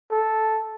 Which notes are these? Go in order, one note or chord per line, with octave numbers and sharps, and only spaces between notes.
A4